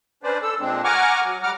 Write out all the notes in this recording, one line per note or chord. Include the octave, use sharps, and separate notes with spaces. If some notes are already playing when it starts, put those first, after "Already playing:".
C#4 D4 B4 C5 D5
A4 E6
A#2 G#3 C4 D4
F#5 G#5 A#5 C#6 D6 F6
F#3
G3 F#5 A#5 D6 F6